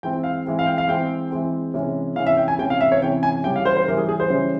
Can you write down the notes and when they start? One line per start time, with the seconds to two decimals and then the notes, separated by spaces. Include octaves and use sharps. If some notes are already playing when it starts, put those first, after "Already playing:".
0.03 E3 G#3 C4 G5
0.24 F5
0.46 E3 G#3 C4
0.59 F5
0.66 G5
0.78 F5
0.88 E3 G#3 C4 G5
1.31 E3 G#3 C4
1.74 C3 E3 G#3 C#4
2.16 C3 E3 G#3 C#4 F5
2.27 E5
2.37 G5
2.48 G#5
2.59 C3 E3 G#3 C#4 G5
2.70 F5
2.81 E5
2.92 C#5
3.02 C3 E3 G#3 C#4 G5
3.23 G#5
3.44 C#3 E3 G3 C#4 G5
3.56 F5
3.65 C5
3.76 C5
3.88 C#3 E3 G3 C#4 A#4
3.97 G#4
4.09 G#4
4.20 C5
4.30 C#3 E3 G3 C#4